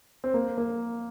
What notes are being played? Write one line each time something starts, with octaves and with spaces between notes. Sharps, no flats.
C4
A#3
A#3